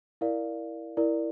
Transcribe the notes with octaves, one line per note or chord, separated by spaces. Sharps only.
E4 A#4 D5 F5
E4 A#4 D5